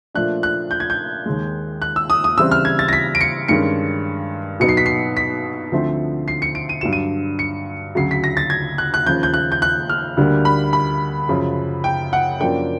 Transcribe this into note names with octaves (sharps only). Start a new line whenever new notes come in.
A#2 F3 A3 D4 F#6
F#6
G6
G#6
G6
D#2 D#3 G#3
F#6
E6
D#6
D#6
C#3 E3 G3 C4 E6
F6
G#6
A6
A#6
B6
D7
C#7
G2 D#3 G#3 C#4 C#7
B2 F#3 B3 D#4 C#7
C7
B6
C7
B6
D2 D3 F3 A3 C4
C7
C#7
D7
D#7
G2 D3 F#3 E7
D#7
C#7
D2 C#3 F#3 C7
B6
A#6
A6
G#6
F#6
F#6
D#2 C#3 F3 G6
G6
F#6
G6
F#6
F6
D2 D3 G3 A#3
B5
B5
F#2 C#3 F3
G5
F#5
F#2 C#3 F3 A#3 D4 G5